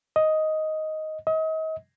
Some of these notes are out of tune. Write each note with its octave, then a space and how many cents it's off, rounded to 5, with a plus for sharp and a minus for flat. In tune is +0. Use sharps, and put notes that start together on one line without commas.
D#5 +5
D#5 +35